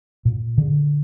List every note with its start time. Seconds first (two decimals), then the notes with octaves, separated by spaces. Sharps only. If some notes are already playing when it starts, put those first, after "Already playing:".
0.25 A#2
0.58 D3